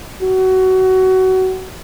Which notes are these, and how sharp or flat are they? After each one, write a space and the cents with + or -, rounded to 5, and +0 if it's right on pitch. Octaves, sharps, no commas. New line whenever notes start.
F#4 +20